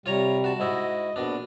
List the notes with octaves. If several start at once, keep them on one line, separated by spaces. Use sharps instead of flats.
C3 G3 F4 C#5 A#5
F#4 A5
G#2 E4 F#4 D#5
A#1 B2 D4